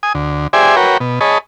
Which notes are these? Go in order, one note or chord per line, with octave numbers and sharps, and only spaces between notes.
G#5 D#6
D2
G4 G#4 C5 D5 E5 G#5
F#4 A#4 B4 C#5 G5
B2
G#4 C#5 D#5 A5 B5